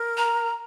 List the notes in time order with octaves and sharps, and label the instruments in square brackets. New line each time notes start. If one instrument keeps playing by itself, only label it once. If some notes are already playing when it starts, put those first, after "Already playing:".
Already playing: [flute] A#4
[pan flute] A#5